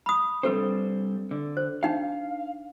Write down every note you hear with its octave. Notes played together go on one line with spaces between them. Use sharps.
B5 D#6
G3 C4 D4 A4 B4 C5
D3
C5
D4 D#4 F5 G5